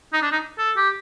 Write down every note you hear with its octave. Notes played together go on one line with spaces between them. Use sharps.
D#4
D4
D#4
A4
G4